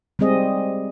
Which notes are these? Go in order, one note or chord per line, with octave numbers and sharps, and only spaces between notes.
G3 G#3 C4 G#4 D#5